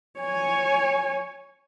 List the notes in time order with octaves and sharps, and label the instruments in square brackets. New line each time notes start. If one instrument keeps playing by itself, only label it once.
[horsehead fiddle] C#5 G#5